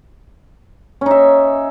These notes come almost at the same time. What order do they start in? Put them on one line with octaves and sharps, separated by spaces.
C#4 D#4 E5